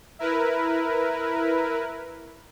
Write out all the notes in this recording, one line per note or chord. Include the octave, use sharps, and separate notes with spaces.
E4 A#4 B4